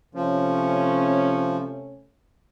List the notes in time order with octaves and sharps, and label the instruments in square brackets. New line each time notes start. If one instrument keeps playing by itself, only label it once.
[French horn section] C3 A3 C#4 [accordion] F3